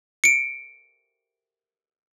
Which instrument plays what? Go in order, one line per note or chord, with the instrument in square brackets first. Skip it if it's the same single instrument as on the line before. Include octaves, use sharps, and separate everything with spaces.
[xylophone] C#7 D7